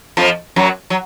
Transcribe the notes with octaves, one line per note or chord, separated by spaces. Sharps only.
F2 F3
F#2 F#3
F#3